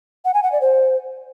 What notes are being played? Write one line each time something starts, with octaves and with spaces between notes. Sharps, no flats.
F#5
G#5
F#5
D5
C5